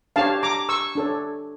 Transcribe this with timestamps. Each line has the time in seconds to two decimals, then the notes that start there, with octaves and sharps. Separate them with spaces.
0.16 D4 G4 C#5 F5 A5
0.43 A#5 D6
0.69 C#6 E6
0.95 D4 A4 C#5